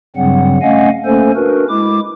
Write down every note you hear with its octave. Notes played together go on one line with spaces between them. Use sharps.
G2 C#3 F#3 G3 C4 F#5
A3 C#4 D#5 F5 F#5 G#5
A3 A#3 C#4 A4 C5 G#5
D4 F#4 A#4 B4
G#3 E4 D6